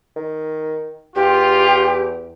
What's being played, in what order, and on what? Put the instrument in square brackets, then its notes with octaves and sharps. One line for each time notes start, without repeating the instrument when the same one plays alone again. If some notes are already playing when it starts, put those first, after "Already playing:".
[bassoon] D#3
[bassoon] E2 [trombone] F4 [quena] G4